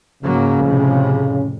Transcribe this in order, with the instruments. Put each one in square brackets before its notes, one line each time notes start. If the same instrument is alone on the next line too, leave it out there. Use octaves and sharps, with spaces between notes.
[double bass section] G#2 F#3 A#3 [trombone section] C#3
[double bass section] F2 A2 C3